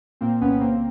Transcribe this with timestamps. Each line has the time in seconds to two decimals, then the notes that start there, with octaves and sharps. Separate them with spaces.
0.21 A#2 A#3 C4
0.41 C2 B3 C#4
0.61 C#3 A#3 C4